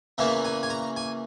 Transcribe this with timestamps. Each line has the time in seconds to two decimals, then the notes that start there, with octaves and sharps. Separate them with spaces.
0.18 E2 C#3 E3 A#3 C#4 E5
0.44 G#5
0.63 G#5
0.70 A#5
0.96 G#5